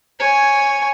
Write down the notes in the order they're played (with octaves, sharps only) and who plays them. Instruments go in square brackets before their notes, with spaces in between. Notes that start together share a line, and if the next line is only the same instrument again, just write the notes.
[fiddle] C#5 G#5